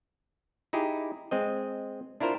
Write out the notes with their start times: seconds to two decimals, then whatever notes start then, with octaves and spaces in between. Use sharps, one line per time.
0.73 D#4 E4 G4 G#4
1.31 G#3 C4 D#5
2.20 D4 E4 F4 A#4 C5